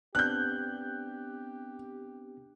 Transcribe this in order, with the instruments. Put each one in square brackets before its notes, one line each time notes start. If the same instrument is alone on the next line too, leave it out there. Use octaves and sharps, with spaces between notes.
[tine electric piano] B3 C4 D4 [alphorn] G4 [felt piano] F#6 G6